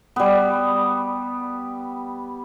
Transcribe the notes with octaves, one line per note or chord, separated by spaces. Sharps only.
G3 B3